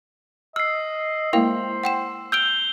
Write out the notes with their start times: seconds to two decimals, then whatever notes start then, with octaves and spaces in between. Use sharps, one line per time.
0.56 D#5 E6 F6 C7
1.33 G#3 A#3 E4 A#4 C5 F5 G5
1.84 F#5 G5 E7
2.32 E6 F6 G6 D7 F7 G7